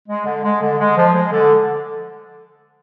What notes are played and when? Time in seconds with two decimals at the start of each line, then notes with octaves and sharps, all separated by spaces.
0.08 G#3
0.25 D3
0.43 G#3
0.61 D3
0.79 G#3
0.97 F3
1.14 G#3
1.32 D3